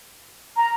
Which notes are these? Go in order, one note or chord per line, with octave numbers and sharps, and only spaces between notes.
A#5